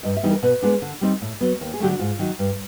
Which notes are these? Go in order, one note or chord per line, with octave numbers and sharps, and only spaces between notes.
G2 D#5
E5
E3 G3 B3 D#4
A#4
B2 B4
G#3 B3 D4
D3
G3 C4 D#4
A2
F#3 B3
D#2
G#4
D3 F#3 A3 G4
F#4
G#2 F4
D#3 F#3
G2